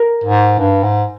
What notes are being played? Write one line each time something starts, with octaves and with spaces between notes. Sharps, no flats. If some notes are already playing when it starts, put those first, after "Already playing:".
Already playing: A#4
G#2
G2
G#2